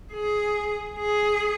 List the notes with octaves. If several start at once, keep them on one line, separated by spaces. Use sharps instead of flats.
G#4
G#4